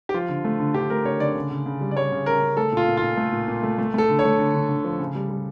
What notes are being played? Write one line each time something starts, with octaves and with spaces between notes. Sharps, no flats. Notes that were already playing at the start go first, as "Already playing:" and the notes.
G4
F3 F4
D3
A3
D3
D3 G4
A3 A#4
D3 C#5
D3 D5
C#3
C#3
C#3
G3
D5
G3 C#5
C#3
C#3 A#4
C#3
A3 A4
A#2 F4
A#2
F4
A#2
A3
A#2
A#2
A3
A3
A3 A4
D3
C#5
A3
D3
D3
D3
F3
C#3
G3
G3